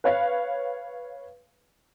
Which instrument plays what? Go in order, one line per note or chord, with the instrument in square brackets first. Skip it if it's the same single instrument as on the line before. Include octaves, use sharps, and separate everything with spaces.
[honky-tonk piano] B4 C#5 F5